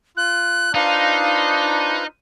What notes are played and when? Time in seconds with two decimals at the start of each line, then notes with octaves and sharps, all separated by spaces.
0.17 F4 F#6
0.75 D4 D#4 F4 B4 C5 F5